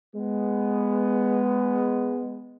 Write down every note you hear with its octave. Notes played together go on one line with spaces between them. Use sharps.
G#3 B3